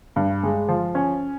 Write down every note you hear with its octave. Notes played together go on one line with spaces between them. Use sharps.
G2
G#3
F3
C#4